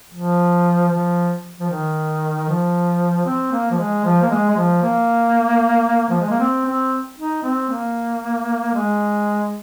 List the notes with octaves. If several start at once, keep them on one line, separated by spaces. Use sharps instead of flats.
F3
F3
F3
D#3
F3
C4
A#3
F3
G#3
F3
A#3
G#3
G#3
F3
A#3
F3
G#3
A#3
C4
C4
D#4
C4
A#3
G#3